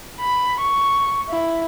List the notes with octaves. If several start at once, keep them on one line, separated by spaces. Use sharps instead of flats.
B5
C#6
E4